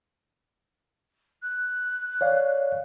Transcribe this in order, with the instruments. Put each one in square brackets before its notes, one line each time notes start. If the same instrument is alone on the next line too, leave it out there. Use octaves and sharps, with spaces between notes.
[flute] F#6
[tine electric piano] C#5 D5 F5